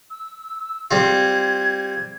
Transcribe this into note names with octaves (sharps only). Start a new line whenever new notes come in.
E6
G3 C4 F4 G#6